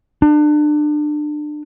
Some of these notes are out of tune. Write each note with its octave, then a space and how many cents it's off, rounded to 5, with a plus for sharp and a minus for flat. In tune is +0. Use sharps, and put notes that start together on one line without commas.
D4 +30